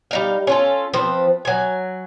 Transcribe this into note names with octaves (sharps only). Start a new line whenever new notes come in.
G3 D#4 F5
C#4 F4 A4
F3 C4 B4
F#3 G#5